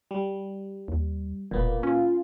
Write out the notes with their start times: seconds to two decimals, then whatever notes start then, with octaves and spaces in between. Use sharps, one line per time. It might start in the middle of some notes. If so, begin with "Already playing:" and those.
0.11 G3
0.88 D#2
1.51 E1 A#2 A#3 B3
1.83 C#4 F4